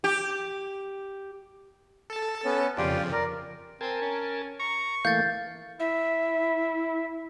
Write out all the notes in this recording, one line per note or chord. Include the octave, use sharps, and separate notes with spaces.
G4
A4 A5
B3 C#4
F2 C#3 F3 F4 G4 D5
A#4 D5
C4 A#4 G#5 A5
C#4
A#5 C#6
E3 A3 A#3 F5 G6 A6
E4 E5